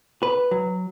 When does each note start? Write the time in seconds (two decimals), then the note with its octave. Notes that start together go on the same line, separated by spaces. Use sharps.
0.23 B4
0.51 F#3